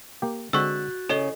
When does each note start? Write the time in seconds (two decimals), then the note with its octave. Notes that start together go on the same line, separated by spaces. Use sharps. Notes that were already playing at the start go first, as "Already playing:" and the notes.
0.22 A#3 G4
0.53 D3 G#3 C4 F#4 C#6 E6 F#6 A6
1.09 C#3 A4 D#5 G#5 G7